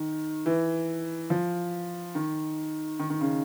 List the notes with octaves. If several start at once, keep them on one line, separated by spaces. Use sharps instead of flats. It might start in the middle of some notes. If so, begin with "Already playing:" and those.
Already playing: D#3
E3
F3
D#3
D#3
D#3
C#3